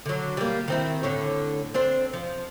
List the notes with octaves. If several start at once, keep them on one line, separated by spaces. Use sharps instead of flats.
D3 F#3
G3 A#3
D#3 C4 E4
A2 D3 C#5
C4 D4 C5
F3